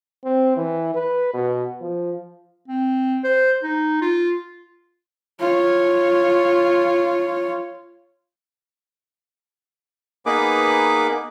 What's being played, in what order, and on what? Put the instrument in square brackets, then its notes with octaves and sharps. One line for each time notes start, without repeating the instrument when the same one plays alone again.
[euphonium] C4
E3
B4
B2
F3
[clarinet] C4
C5
D#4
F4
[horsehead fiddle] F4 C#5
[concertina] A#3 B3 D#4 G#4 B4 D6